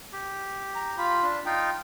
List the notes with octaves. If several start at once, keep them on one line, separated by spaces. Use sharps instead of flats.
G4
A#5
F4 B5
D4
D#4 F4 G5